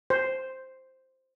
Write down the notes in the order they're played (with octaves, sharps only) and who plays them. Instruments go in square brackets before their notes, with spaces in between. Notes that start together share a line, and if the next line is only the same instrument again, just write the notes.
[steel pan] C5